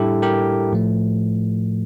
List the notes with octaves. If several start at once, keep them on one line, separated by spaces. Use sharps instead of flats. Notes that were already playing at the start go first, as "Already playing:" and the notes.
Already playing: A2 G3 D4 E4 G4 A4
G4 A#4
A2 F3 A3